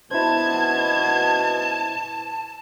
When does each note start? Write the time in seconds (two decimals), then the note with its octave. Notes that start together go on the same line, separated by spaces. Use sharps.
0.11 B2 E4 C5 A5 G#6